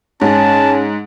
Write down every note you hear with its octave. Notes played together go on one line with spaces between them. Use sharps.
G#2 C#4 A5